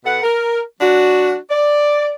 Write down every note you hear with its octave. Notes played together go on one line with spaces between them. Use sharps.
B2 A4 B4 F#5
A#4
F#3 D4 F#4
D5